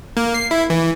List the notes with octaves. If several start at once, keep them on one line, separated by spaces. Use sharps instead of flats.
A#3
C7
E4
E3